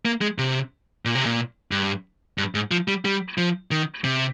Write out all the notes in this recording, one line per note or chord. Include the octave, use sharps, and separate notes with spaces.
A#3
G#3
C3
A#2
C3
A#2
G2
G2
G#2
F3
G3
G3
F3
D#3
C3